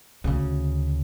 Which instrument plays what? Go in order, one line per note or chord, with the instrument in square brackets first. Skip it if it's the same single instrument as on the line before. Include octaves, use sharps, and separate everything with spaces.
[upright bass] D2 C#3